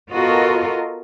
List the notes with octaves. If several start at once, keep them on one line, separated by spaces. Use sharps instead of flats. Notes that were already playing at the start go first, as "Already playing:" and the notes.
B3 F4 F#4 A4 A#4 D#5